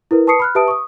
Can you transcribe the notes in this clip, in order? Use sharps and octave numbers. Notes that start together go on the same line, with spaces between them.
E4 A#4 B4
B4 A5 C#6 D#6 C7 C#7
B5 F6 F#6
G4 B4 E5 A5 D#6 D7
C#6 D#6